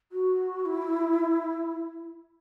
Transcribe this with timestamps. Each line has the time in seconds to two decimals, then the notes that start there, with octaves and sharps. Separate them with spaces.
0.12 F#4
0.66 E4